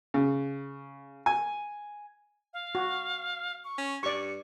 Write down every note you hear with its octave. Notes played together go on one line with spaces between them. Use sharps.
C#3
G#5
F5
F#4
C#6
C#4
G2 D5 C#6 C#7